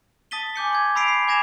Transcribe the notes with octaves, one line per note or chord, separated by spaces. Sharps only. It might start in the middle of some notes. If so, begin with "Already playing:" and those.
A5 D#6 A6 B6 D#7 G7
G#5 D6 G6 C#7
C6 D6 G#6
B5 E6 B6 C7 D7 F7
C7
G#5 D6 G#6 A#6 E7 F7